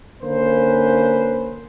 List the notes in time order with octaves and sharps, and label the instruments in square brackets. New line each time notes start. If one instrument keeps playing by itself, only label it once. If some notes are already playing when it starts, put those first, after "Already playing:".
[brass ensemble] D3 A#3 C#4 B4 C5